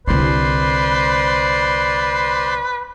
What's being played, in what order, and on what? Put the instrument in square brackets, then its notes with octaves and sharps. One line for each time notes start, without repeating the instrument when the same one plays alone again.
[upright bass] C2 D3 [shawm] B4 [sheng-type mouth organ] C5 D5 C6